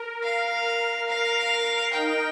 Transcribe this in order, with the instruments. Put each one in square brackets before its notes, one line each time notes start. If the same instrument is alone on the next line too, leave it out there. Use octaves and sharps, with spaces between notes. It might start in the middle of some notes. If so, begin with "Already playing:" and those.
Already playing: [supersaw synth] A#4
[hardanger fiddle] F5
[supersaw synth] A#4 [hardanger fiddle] F5
[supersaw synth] D#4 [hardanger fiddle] G5